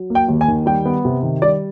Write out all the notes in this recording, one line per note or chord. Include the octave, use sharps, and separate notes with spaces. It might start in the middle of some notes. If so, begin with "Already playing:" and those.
Already playing: F#3
A#3
G5
D#2
G#5
D#3
G3 G5
B3
C3
D#3
G3 D5